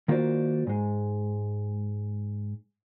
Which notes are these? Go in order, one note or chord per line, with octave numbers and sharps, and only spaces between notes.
D#3 A#3 F4 F#4 C5 D5
G#2 G#3